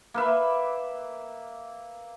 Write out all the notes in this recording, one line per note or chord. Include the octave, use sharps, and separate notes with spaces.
A#3 B4 E5